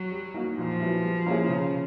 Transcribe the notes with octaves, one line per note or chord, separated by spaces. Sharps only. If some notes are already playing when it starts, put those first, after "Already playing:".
Already playing: F#3
G3
A#3 D#4 F#4
A#2 F3
F#3 B3 E4
G3
A#3 C#4 E4 G#4
C#3